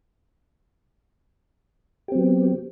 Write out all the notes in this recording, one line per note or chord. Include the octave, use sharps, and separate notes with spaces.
F#3 B3 C4 G4